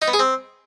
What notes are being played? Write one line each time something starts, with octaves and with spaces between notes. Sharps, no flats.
D#4
B3
G#4
C4